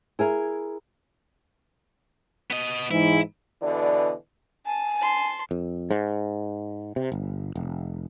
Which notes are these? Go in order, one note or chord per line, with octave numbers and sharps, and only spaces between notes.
E4 G#4 A#4
B3 D#5
G#2 E3 E4
B2 D3 E3 D5
G#5 A5
A5 C6
F2
G#2
C3
G1
F1